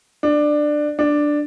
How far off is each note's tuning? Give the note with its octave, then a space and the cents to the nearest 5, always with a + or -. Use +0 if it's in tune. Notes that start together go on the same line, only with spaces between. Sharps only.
D4 +15
D4 +5